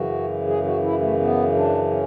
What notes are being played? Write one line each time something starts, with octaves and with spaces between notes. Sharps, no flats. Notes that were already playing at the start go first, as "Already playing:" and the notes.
Already playing: F#2 C#3 E3 F#4
G#4
F#4
E4
A3
B3
D4
C#4